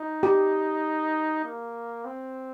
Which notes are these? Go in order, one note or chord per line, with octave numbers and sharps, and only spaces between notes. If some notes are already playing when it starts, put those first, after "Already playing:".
Already playing: D#4
G4
A#3
C4